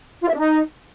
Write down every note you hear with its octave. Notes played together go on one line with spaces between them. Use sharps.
F4
E5
D4
D#4